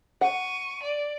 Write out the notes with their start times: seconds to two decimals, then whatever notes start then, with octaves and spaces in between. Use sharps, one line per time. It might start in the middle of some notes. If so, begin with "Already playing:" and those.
0.21 F#5 C#6 D#7
0.83 D5